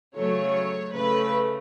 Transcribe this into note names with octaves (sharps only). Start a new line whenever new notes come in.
C#3 F#3 A3 C#5
C#3 A3 B4